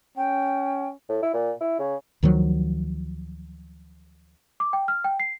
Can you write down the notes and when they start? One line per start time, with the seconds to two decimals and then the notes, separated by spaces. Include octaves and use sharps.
0.17 C#4 G5
1.10 A2
1.23 E4
1.34 A#2
1.61 E4
1.79 C#3
2.23 D2 D#3 F3 F#3
4.60 D6
4.73 G5
4.88 F6
5.04 G5
5.20 C7